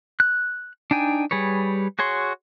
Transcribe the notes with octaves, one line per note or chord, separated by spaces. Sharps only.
F#6
D4 D#4 G5 G#5
G3 G#4 B4 C#5
F#4 G#4 C#5 C6